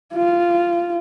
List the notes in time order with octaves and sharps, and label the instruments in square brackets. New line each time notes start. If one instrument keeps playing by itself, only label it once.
[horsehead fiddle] F4